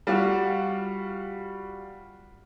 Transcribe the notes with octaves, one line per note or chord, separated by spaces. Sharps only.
G3 F4 F#4